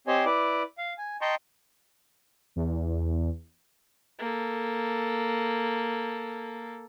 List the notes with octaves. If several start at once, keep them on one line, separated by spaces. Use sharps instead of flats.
C4 G4 C5 C#5 D#5 G#5
E4 B4 D5 D6
F5
G#5
D#5 G5 A5 A#5 C6 C#6
E2
A#3 A4